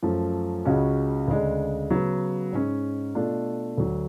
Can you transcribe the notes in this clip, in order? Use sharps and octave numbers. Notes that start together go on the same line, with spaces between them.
F#2 F3 A3
C#2 C#3 G#3 C#4 F#4
D2 C#3 G#3 D4
C#3 F#3 B3
G#2 G#3 C#4
B2 A3 D4 F4
D2 D3 F#3